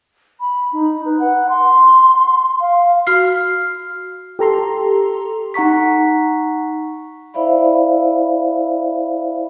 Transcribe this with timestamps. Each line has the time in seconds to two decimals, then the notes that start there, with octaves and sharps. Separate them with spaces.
0.40 B5
0.73 D#4
1.05 B4
1.19 F#5
1.49 C6
2.61 F5
3.07 F#4 F6 C7
4.39 G4 A4 A#5 C6
5.54 D#4 F#5 A#5 C#6 B6
7.34 E4 C5 D5 E5 F5 B5